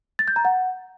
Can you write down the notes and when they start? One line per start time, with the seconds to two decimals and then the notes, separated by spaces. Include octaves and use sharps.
0.19 A6
0.28 G6
0.36 A#5
0.45 F#5